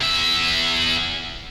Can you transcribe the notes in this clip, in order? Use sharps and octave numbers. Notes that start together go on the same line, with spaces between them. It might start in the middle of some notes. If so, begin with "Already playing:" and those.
E2 E5